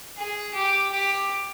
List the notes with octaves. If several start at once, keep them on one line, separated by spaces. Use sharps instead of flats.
G#4
G4
G4